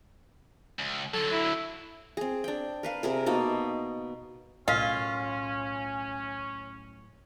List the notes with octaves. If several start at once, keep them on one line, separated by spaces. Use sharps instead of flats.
C#2
D3 F#3 A4
E4
C4 G#4
D4 G5
A#4 B4 F5
C3 G#4 A#4
B2 A#3 D#4 A5
B1 A2 C#4 F4 A#4 D#5 F5